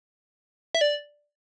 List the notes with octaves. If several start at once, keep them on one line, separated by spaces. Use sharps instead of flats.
E5
D5